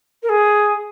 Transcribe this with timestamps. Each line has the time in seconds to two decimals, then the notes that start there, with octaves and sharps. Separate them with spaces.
0.22 A#4
0.29 G#4